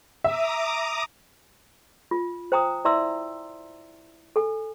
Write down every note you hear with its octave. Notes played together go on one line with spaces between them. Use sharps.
E5 A#5 D6 D#6
F4
C5 G5 A#5 D#6
E4 D5 E5 A#5 C6 E6
A4 G#5